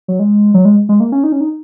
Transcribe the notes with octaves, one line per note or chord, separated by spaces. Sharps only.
F#3
G#3
F#3
G#3
G#3
A#3
C#4
D#4
C#4
D#4